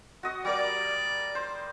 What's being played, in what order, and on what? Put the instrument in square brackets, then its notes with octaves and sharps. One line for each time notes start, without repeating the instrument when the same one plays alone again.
[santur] F#4 D#5 D#6
[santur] G3 A#4 [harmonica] D5
[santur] C5